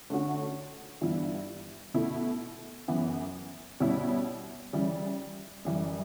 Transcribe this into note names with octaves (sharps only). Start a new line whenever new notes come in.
D3 A3 C#4 F#4
G2 E3 B3 E4
B2 A3 E4
F#2 C#3 E3 B3
B2 G3 C#4 E4
C#3 E3 G3
F#2 E3 G3